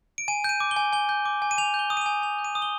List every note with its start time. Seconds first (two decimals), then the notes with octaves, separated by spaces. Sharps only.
0.18 D7
0.28 G#5 D#7
0.44 G6 D#7
0.60 D6
0.71 G7
0.76 G#5
0.93 G#5 G7
1.09 G6
1.26 D6
1.42 G#5
1.51 D#7
1.58 G#5 F7
1.74 G6
1.79 G7
1.90 D#6
1.97 D#7
2.01 G#5 F7
2.22 G#5 F7
2.39 G6
2.45 D#7
2.55 D#6
2.62 G7